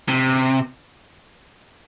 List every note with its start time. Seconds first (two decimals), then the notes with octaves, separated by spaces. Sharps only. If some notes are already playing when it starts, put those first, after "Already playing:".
0.09 C3